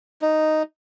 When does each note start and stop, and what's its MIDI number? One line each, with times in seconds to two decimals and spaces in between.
0.22 0.63 63